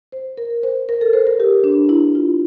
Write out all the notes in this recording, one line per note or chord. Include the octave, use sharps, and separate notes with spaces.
C5
A#4
C5
A#4
A4
C5
A#4
G4
D4
E4
F4